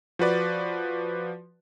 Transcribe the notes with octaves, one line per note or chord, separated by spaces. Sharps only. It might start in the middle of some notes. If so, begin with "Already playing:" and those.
F3 F#4 B4 D5